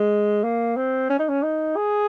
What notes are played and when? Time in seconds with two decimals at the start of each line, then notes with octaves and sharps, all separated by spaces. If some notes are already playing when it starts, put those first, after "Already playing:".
Already playing: G#3
0.43 A#3
0.77 C4
1.10 C#4
1.19 D#4
1.28 C#4
1.43 D#4
1.76 G#4